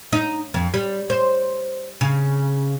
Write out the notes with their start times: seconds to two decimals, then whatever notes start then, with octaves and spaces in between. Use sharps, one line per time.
0.13 D#4
0.54 F2
0.74 G3
1.10 C5
2.01 C#3